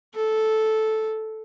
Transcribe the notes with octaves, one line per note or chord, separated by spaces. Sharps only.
A4